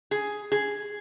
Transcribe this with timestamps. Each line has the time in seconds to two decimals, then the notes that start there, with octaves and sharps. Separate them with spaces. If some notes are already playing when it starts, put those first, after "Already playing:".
0.11 G#4
0.52 G#4